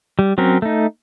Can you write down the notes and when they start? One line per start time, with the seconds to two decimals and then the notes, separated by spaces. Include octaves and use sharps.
0.19 G3
0.38 F#3 C4 C#4 A#4
0.62 A3 D#4